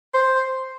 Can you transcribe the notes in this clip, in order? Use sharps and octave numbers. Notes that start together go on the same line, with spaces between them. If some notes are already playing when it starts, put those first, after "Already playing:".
C5